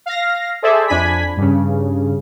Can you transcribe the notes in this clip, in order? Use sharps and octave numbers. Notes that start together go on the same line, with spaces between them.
F5 A#6
G#4 A4 C5 D5 E5
F2 D4 G#5 B5 B6
G2 C#3